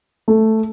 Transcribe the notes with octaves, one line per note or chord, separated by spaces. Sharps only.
A3